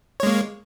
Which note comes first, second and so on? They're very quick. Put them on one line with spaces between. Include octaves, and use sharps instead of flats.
C#5 G#3 A#3